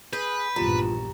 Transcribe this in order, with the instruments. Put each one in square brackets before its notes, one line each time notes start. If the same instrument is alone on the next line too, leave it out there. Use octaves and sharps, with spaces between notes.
[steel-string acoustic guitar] G#4 [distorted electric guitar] B4 [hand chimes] G6
[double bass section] A#1 E2 G2 [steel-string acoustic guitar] F3 [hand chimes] G4 A#5